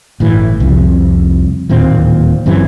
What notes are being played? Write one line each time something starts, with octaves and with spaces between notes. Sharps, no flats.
G1 A2 E3
C2 F2
D1 D#2 A#2 C4
G1 F#2 C3 E3